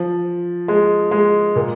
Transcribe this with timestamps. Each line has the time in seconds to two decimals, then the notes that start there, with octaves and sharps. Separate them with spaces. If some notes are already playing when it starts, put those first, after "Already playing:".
Already playing: F3
0.68 G#3
1.11 G#3
1.56 A#2